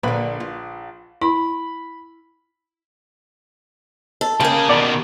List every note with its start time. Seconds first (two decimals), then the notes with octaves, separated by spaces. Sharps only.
0.03 A#1 A#2 D3 B4 B5
0.40 F4
1.22 E4 B5
4.21 A4
4.40 C#3 A#3 G4 G#4
4.69 B2 D#3 D5 B5